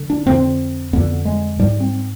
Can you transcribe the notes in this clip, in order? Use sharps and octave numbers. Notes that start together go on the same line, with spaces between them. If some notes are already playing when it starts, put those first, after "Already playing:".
Already playing: D3
D4
F2 D3 C4
F2 D3 B3
G#3
G#2 G3
C4